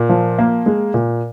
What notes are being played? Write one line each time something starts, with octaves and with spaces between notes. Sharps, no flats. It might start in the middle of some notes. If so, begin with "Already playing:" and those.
Already playing: A#2
F3
A#3
G#3
A#2